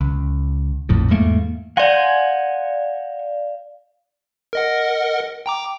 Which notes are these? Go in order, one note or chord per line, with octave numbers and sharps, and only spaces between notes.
C#2
A#1 F2 A2
E2 G#2 A3 A#3
D5 F5 F#5 G#5 C6
A#4 D#5 F#5
G5 A#5 D6